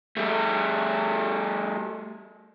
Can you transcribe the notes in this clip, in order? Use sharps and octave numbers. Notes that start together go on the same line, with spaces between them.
G3 A3